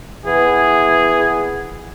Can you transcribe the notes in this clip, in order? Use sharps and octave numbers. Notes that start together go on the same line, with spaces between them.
E3 B3 G#4